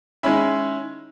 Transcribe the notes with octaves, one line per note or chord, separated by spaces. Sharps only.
D#3 G#3 C#4 E4 B5